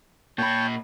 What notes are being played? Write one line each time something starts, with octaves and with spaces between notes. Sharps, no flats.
A#2 C#5 G5 A5 B5